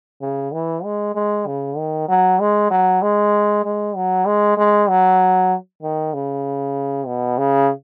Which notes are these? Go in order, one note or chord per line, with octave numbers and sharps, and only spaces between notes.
C#3
E3
G#3
G#3
C#3
D#3
F#3
G#3
F#3
G#3
G#3
F#3
G#3
G#3
F#3
D#3
C#3
B2
C#3